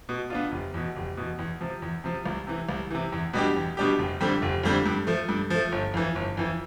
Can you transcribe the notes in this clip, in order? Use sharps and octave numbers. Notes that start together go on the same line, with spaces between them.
B2
B3 D4 F4
F1
E2 B2
F1
E2 B2
E2
C3 F3
E2
C3 F3
C2
C3 E3
C2
C3 E3
E2
B2 G3 D4 G4
E2
B2 G3 D4 G4
F1
F2 D3 G3 C4
F1
F2 D3 G3 C4
G2
F3 A3
G2
F3 A3
G1
F2 E3
G1
F2 E3